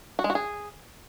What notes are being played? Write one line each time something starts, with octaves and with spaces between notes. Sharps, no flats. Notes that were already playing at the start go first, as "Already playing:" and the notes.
F#4
G#3
F#4
G#4